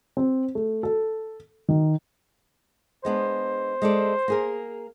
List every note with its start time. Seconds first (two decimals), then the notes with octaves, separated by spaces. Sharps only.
0.17 C4
0.55 A3
0.83 A4
1.68 D#3
3.05 G#3 B3 D4 C5
3.82 G#3 A4 D5
4.28 A#3 G#4 A#4